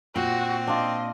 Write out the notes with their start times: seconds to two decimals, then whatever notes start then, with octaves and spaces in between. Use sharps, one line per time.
0.16 A#2 C4 F#4
0.67 D4 F4 D#5